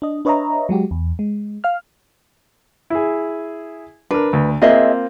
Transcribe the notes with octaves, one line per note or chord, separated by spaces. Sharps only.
D4 D#5
D4 B4 C#5 D#5 E5 A#5
F#3 G#3 F#4 G4
E2
G#3
F5 F6
E4 G#4
D4 A#4 B4
D2
A#3 C4 F4 G#4 D#5 E5